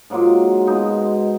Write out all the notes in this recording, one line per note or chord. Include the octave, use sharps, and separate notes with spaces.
G#2 F#3 A#3 F4
B2 G#3 D#4